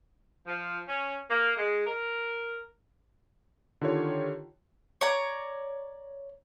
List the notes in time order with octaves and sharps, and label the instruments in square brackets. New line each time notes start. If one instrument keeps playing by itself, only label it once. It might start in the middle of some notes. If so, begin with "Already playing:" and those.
[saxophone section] F3
C#4
A#3
G#3
A#4
[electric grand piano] D3 D#3 F4 G4 C#5
[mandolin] C#5 D5 A#5